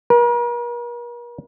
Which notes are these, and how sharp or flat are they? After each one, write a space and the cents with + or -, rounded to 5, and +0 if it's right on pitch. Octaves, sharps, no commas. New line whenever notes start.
A#4 +45